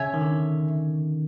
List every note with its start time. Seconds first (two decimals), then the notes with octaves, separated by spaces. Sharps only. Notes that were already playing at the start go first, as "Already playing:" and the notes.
Already playing: C#3 C#5 E5 G#5
0.14 D#3
0.21 D3